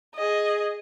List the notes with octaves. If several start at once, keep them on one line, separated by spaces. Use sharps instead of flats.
G#4 D#5